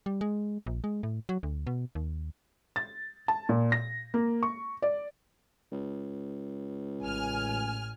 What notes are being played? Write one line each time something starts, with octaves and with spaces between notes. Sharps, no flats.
G3
G#3
A#1
G#3
A2
F#3
D2
B2
D#2
A6
A5
A#2
A#6
A#3
C#6
D5
C#2
A1 G#5 F6